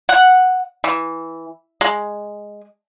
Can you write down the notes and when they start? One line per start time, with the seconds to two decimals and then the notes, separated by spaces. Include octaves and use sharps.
0.09 F#5
0.84 E3
1.81 G#3